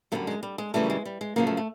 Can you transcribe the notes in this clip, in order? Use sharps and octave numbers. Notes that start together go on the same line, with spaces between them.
F#2 D3 G3 A3
G#3
G3
G#3
F#2 C#3 E3 G3 A3
G#3
G3
G#3
F#2 C#3 F3 A#3
A3
A3